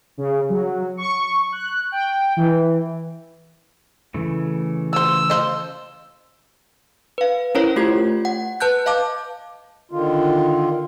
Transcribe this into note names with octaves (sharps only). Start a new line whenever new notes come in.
C#3
F#3
C#6
F#6
G5
E3
C#3 E3 A3
F3 C5 E6
F3 C5 D#5
B4 F5
C#4 E4 A#4 C5 C#5 A#5
A3 F4 G4 G#6
F#5
B4 A5 F#6 G6
D#5 F5 A5 D6
D3 D#3 F4